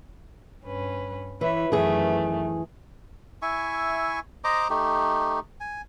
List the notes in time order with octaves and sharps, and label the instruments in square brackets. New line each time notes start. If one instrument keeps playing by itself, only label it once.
[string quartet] G2 C#4 B4
[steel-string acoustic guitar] E3 [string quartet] B4 C#5 E5
[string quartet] F#2 D#3 A3 [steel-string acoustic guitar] E3 G#4
[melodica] E4 E5 G#5 C#6
C5 D#5 A#5 D6
A3 D#4 G4
G#5